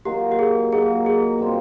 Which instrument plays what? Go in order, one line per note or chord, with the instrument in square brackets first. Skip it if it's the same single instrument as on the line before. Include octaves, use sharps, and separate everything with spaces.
[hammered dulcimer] F#3 A#3 D#4 [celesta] G4
[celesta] G4
G#4
[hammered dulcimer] F#3 A#3 D#4 [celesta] G#4
[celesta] G#4
[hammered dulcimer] B2 G3 C4 F4